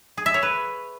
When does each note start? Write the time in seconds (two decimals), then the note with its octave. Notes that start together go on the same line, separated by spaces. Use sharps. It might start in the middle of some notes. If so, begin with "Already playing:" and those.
0.17 G#4
0.26 E5
0.34 C#5
0.43 B4